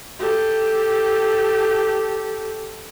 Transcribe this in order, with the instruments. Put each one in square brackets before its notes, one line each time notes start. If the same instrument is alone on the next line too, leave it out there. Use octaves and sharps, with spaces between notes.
[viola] G4 A4